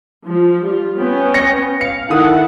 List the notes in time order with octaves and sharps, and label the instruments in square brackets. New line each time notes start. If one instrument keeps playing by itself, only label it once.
[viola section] F3
G3 F4
B3 C#4 G5
[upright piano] A#6 C#7
[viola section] F5 [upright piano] C#7
[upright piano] D#3 D#6 [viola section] E4 A4 F#5